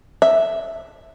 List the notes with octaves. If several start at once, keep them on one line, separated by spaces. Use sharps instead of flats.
E5